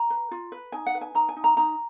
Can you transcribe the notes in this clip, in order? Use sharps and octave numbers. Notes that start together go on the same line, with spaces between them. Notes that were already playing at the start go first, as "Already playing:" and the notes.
Already playing: A#5
B4
F4
B4
D#4 G#5
F#5
B4
G#5
D#4 A#5
G#5
D#4
A#5
D#4 A#5